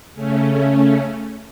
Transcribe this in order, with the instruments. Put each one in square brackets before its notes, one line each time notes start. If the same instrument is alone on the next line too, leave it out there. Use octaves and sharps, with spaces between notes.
[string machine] C#3 A3 C#4